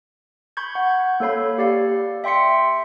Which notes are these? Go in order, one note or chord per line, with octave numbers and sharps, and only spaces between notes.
B5 C#6 G6 G#6
F#5
A#3 A4 C#5 F5 B5
G4 D5 F5
E5 G5 C6 B6 C#7